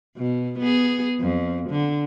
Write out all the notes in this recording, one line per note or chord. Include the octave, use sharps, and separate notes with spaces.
B2
B3 G#4
F2
D3